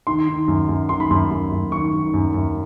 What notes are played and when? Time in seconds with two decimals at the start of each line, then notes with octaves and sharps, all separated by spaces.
0.07 D#3 C6
0.28 D#3
0.48 F#2
0.69 F#2
0.89 D#3 C6
1.00 B5
1.10 F#2 C6
1.31 F#2
1.52 F#2
1.72 D#3 C#6
1.93 D#3
2.14 F#2
2.34 F#2